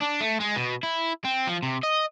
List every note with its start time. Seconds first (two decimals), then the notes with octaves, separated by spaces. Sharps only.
0.01 D4
0.20 A3
0.40 G#3
0.56 B2
0.83 E4
1.25 C4
1.47 F3
1.63 C3
1.83 D#5